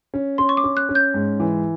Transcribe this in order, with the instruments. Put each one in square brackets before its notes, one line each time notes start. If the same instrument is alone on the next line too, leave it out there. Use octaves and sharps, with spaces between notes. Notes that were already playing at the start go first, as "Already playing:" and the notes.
[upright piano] C#4
[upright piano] C#4 [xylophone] C6
[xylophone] C#6
D6
[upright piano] C#4
[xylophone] F#6
[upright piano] C#4
[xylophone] G6
[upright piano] G#2
E3